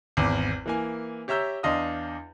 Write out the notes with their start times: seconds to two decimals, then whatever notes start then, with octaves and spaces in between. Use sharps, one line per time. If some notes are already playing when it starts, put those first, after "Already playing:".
0.17 G#1 E2 D6
0.66 E3 A#3 G#5
1.28 G4 C#5 E5 A#5 E6 G6
1.63 E2 D4 D#5 F5 C6 D#6